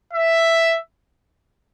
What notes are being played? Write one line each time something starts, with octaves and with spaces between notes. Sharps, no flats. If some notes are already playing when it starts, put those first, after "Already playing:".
E5